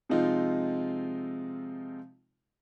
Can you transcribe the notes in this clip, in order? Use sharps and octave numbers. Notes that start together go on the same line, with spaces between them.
C3 F3 G#3 C4 D#4 F4